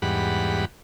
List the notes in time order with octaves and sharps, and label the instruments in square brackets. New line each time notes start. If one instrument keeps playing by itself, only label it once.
[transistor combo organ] E2 G#2 G3 F#5 B5